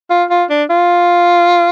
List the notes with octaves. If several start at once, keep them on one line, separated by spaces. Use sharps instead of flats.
F4
F4
D4
F4